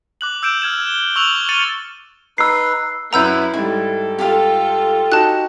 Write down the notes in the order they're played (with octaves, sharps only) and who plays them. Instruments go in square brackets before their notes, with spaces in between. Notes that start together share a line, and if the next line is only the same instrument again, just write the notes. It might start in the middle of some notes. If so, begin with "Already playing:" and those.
[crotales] D6 F#6 F#7
E6 G6 D7 E7
E6 F6 G#6 E7
G7
C#6 E6 F#6 F7 F#7
F6 A6 C#7 D#7 F#7 G7
[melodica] D#4 B4 [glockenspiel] E6 C7
[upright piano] F#2 B4 F#5 [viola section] E4 [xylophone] A#5 E6 G6
[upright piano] G#2 G3 [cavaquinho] E4 [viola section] A4
[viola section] F4 A4 [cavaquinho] G4 F5
[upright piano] D#4 F#4 [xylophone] A5 F#6